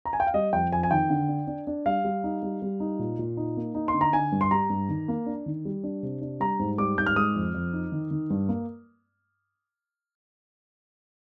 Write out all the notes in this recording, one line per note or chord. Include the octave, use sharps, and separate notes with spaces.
A#5
G#5
G5
F5
G3 D#5
F2 G5
F2 G#5
G#5
D#3 G5
D3
D4
D4
D4
G3 F5
G3
D#4
G3
G3
D#4
A#2
A#2
D#4
A#3
D#4
C6
D3
A#5
D3 G#5
G2
C6
G3 A#5
G2
D#3
A#3
D4
D#3
G3
D4
C3
D4
G3 A#5
G#2
G3 D6
G#2 G6
F6
G#3 D#6
F2
F2
D#4
D#3
D#3
G2
A#3